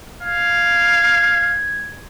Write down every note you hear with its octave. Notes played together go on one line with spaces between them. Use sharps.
F5 G#6